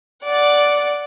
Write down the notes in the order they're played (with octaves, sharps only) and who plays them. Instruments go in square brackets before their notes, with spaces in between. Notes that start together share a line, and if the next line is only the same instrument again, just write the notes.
[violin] D5 F#5